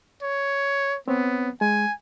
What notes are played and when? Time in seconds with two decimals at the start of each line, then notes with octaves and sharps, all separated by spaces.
0.22 C#5
1.08 B3 C4 C#5
1.61 G#3 G#5